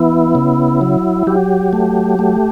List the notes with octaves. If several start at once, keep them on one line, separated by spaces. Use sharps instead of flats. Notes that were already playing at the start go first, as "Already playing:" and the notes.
Already playing: E3 B3 E4
C#3
F#3
F#3 G4
A3
A3